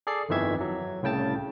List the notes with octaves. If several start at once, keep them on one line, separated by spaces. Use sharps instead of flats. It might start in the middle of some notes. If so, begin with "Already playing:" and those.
G#4 A4 D5 C7
G1 F2 D#3 E3 E5 G#6
F#3
C2 A2 C#3 G5 A5 A6